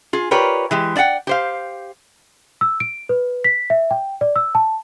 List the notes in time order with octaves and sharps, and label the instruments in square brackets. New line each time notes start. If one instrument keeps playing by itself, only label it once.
[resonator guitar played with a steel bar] F4 G#4
F4 G4 A#4 B4 C#5 D5
E3 G#3 G4
D4 D5 E5 F#5 G5
G4 C5 F5
[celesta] E6
D7
B4
B6
E5
G5
D5
E6
A5